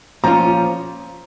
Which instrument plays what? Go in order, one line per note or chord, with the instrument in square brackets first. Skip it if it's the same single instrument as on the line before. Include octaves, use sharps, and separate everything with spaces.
[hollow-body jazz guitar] A#2 F3 C#4 F4 [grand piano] A#5